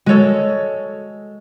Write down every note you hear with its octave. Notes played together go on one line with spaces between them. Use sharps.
G#3 F#4 A4 C#5